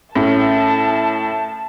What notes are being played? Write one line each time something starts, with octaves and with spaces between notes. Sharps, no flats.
A2 C#4 A5